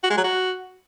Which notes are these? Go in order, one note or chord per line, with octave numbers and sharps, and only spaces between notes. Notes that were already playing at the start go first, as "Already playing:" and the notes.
F#4
G#3
F#3
F#4